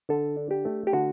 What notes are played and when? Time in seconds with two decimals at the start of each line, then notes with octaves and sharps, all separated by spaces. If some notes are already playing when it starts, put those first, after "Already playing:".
0.09 D3 A4
0.37 D4
0.51 G4
0.65 A3
0.87 G4
0.93 D3 F#4